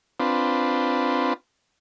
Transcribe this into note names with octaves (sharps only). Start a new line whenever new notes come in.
C4 D4 F4 B4